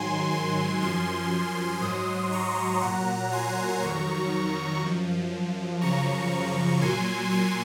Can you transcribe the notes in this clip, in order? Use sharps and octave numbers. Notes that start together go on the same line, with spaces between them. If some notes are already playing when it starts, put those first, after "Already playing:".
Already playing: G#2 D#3 F#3 G#5 C6
G#5 C6
F#2 F3 G#5 C6
G#2 F#3 C6 D#6
A#5 C#6
A#2 F#3 F#5 A#5
G#5 C6
F2 D#3 F#3 A#5 C#6
F#2 F3
F#2 C#3 F3 A#5 C#6
A#2 F#3 G#5 C6
G#5 C6